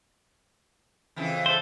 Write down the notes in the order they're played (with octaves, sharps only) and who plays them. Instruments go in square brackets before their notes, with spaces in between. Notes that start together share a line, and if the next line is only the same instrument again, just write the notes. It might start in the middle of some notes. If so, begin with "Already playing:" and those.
[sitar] F2 C#3 E3
[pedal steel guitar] A4 C5